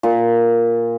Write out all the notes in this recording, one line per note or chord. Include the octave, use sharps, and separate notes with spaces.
A#2